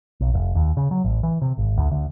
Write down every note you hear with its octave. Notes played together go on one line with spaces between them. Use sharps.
B1
F1
D#2
C#3
F#3
A1
E3
C3
G#1
D2
D2